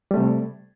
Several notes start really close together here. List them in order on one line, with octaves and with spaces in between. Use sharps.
G3 A3 C3